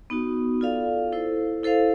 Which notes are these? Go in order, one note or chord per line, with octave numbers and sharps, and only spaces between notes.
B3 D#4 F#4
F4 A4 D5 F5
E4 A4 C5
E4 A4 C5 F5